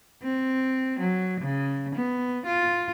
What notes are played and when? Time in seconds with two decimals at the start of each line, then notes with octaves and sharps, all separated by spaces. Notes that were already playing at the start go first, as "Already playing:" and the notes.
0.23 C4
1.00 F#3
1.41 C#3
1.95 B3
2.46 F4